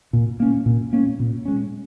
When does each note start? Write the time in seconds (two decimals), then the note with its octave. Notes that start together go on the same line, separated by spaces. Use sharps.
0.13 A#2
0.40 A#3 C#4
0.66 A#2
0.93 A#3 C#4
1.20 A#2
1.45 G#3 C#4